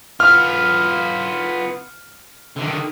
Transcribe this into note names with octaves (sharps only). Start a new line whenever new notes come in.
B3 F4 F6
D3 D#3